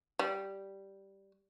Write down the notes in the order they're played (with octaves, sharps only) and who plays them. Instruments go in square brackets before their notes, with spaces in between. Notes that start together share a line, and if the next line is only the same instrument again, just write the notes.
[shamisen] G3